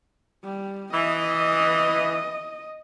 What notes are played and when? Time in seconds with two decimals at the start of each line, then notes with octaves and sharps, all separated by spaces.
0.44 G3
0.93 E3 D#5